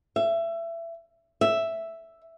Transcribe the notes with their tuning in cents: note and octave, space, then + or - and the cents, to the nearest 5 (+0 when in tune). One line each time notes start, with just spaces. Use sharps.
E5 +25
E5 +0